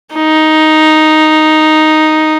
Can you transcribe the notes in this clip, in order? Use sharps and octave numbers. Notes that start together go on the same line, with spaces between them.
D#4